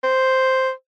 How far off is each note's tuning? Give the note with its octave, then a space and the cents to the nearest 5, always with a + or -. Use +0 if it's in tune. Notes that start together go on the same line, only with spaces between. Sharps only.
C5 +0